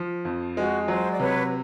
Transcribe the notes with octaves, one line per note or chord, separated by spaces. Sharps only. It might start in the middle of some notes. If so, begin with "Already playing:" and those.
Already playing: F3
F2
G#3 F#4
F#3 C5
D5
C3 B4 C#5